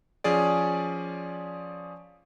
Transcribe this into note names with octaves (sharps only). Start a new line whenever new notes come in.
F3 C#4 G#4 D5